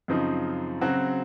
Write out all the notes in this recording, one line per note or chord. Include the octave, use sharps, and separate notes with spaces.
F#2 C#3 F3 C4 D#4
C#3 F#3 C4 F#4